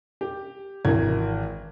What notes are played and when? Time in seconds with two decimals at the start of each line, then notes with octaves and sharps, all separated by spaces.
0.21 G4
0.85 G#1 E3 A#4 G#6